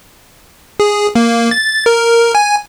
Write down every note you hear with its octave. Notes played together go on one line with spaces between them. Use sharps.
G#4
A#3
A6
A#4
G#5